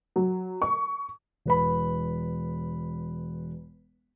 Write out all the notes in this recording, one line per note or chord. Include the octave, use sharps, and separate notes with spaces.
F#3
C#6
E1 B4 B5